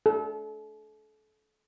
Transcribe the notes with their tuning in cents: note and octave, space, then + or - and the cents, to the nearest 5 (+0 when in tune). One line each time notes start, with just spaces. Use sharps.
A4 -30